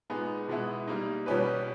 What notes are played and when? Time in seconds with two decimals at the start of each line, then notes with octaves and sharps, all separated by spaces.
0.10 A#2 G#3 B3 D#4 G#4
0.48 B2 G#3 B3 E4
0.88 G3 A#3 D#4
1.26 B2 G3 C#4 G4 B4